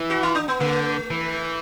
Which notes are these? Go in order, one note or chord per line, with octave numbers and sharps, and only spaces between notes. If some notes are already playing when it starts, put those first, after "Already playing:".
Already playing: E3
F#4
E4
D4
B3
D3 A3
E3